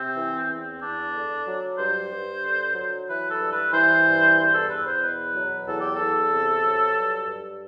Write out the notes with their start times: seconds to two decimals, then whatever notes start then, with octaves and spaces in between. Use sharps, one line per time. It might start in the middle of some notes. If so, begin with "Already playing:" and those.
Already playing: C3 C4
0.16 E3
0.49 E2 C4
0.81 E2 D4
1.14 D3
1.46 F#3
1.78 G2 C5
2.11 G2
2.44 D3
2.75 F#3
3.08 E3 B4
3.30 A4
3.40 G2
3.51 B4
3.72 E3 C5
4.05 G2
4.37 E2 C5
4.54 A4
4.70 E2 B4
4.87 C5
5.02 B2 B4
5.35 F#3
5.67 E2 A4
5.80 G4
5.94 A4
6.00 E2
6.32 C3
6.64 F#3
6.97 G2
7.29 G2